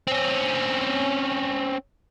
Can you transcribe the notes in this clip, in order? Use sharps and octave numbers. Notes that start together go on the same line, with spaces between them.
C4 C#4